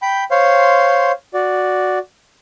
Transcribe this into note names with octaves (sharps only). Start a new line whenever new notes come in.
G5 B5 G6
C5 C#5 F5 C6
F#4 D5